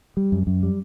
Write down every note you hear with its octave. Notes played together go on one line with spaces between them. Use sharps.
G3
F#2
F#2
G3